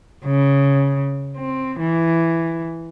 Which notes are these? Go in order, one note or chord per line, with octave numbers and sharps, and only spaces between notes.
C#3
C4
E3